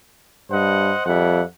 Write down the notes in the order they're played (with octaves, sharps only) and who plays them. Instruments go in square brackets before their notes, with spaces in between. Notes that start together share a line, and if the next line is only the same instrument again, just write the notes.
[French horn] G2 [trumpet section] C5 D#5 F#5
[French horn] F2 [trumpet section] G3 E5 F#5